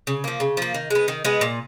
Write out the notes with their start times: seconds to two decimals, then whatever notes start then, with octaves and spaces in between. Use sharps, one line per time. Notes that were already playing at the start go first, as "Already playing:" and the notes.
0.07 C#3
0.24 F3 A#3
0.40 C#3
0.57 F3 A#3
0.74 D#3
0.90 G#3 B3
1.08 D#3
1.25 G#3 B3
1.41 A#2